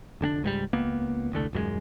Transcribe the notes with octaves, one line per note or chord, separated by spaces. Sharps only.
F1 D3 C4 D4
C#2 G#2 F#3 G3
C#2 A#3 B3
E1 C2 D3 A3
D#1 F#2 F#3 G#3